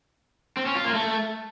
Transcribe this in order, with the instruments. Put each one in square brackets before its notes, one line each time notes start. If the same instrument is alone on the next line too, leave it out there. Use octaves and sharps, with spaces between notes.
[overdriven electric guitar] C4
C#4
F4
A#3
A3